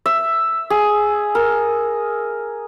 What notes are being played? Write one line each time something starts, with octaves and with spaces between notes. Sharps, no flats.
E5
G#4
A#4